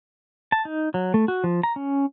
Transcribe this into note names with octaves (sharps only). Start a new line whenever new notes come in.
A5
D#4
F#3
A3
F#4
F3
A#5
C#4